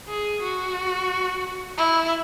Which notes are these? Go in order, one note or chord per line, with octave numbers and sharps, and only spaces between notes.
G#4
F#4
E4